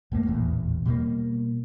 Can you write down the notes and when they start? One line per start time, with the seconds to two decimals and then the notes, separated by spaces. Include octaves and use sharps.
0.12 F#2 A3 A#3
0.26 D#1 A1 E2
0.85 B2 G3 G#3 A#3